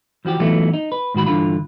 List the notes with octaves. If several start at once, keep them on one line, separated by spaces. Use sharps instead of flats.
E3 F3 F#4 G4
E3 F#3 A3 B3 D#4 F4
D#4
B4
G#2 D#3 F#4 B5
G2 D3 E3 F4 B5